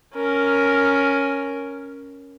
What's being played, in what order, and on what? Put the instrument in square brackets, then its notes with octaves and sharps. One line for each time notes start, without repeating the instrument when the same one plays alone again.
[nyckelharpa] C#4 A#4